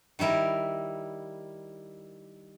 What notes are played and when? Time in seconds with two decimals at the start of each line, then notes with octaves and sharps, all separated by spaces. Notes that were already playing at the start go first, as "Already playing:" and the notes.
0.19 D#3 G3 E4 A#4